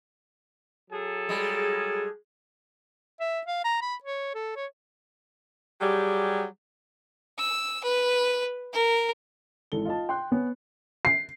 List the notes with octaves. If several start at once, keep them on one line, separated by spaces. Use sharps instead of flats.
F#3 G#4 A4
G3 G#3
E5
F5
A#5
B5
C#5
A4
C#5
F#3 G3 G4 G#4
E6
B4
A#4
G#1 E3 A4 G7
F4 D#5 A5
G5 C6 F#6
B3 C#5 G#5
C7